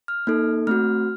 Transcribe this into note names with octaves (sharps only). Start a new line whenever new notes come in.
F6
A#3 D#4 A4
A3 C4 F#4 F6